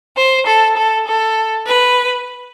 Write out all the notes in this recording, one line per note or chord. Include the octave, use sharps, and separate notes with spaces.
C5
A4
A4
A4
B4